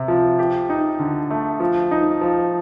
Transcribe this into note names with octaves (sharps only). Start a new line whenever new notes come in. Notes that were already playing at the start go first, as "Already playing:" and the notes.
Already playing: C3
F3
G4
D#4
D3
A3
F3
D#4
F3